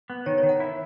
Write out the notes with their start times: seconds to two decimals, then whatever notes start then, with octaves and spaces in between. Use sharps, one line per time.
0.10 B3
0.26 D#3 C#5
0.38 C#5
0.44 D#3
0.49 F#5
0.60 E4